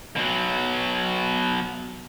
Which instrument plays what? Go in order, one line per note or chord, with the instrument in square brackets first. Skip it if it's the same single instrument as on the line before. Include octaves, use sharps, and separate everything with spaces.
[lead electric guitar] B2 F#3